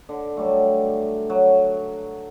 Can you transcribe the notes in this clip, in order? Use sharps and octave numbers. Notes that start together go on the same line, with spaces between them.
D3
F#3 G3 A3
F#3